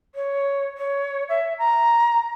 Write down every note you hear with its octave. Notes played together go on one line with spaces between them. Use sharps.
C#5
C#5
E5
A#5